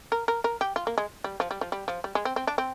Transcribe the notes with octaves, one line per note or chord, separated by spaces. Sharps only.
A#4
A#4
A#4
G4
F4
A#3
G#3
G3
F3
G3
F3
G3
F3
G3
G#3
C4
C4
D4
C4